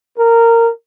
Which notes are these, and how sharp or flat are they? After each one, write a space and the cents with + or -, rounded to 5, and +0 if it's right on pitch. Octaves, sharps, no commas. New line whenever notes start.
A#4 -15